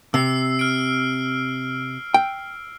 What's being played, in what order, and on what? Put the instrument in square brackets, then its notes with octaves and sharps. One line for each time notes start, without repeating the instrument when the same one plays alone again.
[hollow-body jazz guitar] C3 [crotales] E6 C7
[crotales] F6 D7
[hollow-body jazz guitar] G5